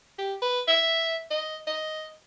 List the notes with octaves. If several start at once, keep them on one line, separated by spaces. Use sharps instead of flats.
G4
B4
E5
D#5
D#5